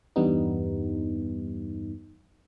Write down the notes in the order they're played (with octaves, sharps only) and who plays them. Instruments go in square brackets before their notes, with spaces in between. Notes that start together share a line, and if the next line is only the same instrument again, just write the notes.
[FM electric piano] E2 G2 G3 B3 D#4